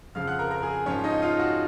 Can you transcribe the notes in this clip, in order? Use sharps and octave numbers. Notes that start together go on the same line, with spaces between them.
F2 C#3 F3 F5 F6
F#5 F#6
A#4 A#5
A#4 A#5
G#4 G#5
G#2 F3 C#4 C#5
D#4 D#5
F4 F5
F#4 F#5